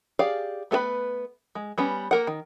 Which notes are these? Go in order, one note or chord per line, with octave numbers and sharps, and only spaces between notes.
G4 G#4 D5 F5
A3 B3 A4 B4 B5
G#3
G3 B3 C#4
A#3 A#4 F#5
D#3